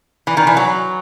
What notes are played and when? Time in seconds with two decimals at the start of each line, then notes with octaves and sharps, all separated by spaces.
0.27 E3
0.37 D#3
0.47 E3
0.57 F#3